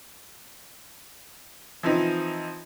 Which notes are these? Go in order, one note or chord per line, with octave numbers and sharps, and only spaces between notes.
E3 F3 C4 D#4